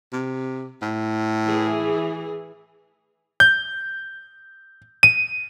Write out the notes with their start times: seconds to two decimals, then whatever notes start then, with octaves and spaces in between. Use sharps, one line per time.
0.13 C3
0.82 A2
1.49 E3 G#4
3.40 G6
5.03 D#7